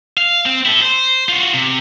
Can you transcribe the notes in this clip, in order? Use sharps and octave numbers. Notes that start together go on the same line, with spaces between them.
F5
C4
E4 A4
C5
F4 F#4
C3